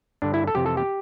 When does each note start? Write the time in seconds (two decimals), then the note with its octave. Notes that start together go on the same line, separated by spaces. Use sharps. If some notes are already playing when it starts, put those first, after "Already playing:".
0.22 G2 D3 D4
0.34 E4
0.47 A4
0.55 F2 C3 E3 G4
0.66 A4
0.77 G4